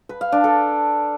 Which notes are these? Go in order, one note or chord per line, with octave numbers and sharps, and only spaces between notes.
B4
F5
D4
A4